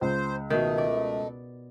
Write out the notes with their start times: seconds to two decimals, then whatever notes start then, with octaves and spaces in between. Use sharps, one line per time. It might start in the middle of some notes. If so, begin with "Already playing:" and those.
0.01 C#2 C5
0.50 B2 D#3 A3 D#5
0.78 D5